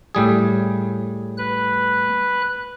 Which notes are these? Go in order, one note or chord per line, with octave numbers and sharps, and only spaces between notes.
A2 G3 G#4
B4 F#6